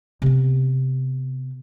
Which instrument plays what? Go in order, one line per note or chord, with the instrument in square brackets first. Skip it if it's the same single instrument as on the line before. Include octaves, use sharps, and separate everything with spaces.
[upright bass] C3 B3